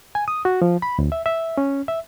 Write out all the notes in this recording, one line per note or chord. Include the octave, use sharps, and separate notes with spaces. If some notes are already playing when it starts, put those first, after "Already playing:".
G#5
D#6
F#4
F3
B5
D2
E5
E5
C#4
E5